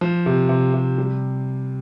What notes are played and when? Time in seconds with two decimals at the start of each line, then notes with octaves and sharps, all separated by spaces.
0.01 F3
0.26 C3
0.49 C3
0.74 C3
0.98 G3